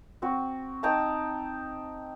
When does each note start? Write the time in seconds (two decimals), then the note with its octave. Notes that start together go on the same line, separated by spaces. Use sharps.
0.22 C4 F#4
0.83 D#4 G5 A5 A#5